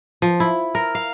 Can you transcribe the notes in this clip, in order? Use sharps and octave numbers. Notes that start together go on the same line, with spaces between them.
F3
E4
A#4
F5